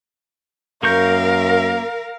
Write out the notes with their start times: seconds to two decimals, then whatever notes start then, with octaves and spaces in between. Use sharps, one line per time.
0.83 F#2 A#3 A#4 F5 C#6 G6